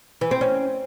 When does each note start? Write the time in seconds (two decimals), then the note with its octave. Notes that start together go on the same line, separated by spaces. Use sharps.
0.21 E3
0.31 C4
0.41 C#4